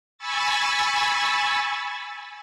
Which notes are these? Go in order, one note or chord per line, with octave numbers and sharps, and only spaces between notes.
G#5 B5 C#6 E6 A6